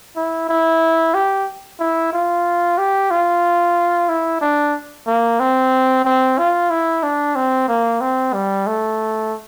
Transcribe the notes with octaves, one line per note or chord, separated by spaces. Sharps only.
E4
E4
G4
E4
F4
G4
F4
E4
D4
A#3
C4
C4
F4
E4
D4
C4
A#3
C4
G3
A3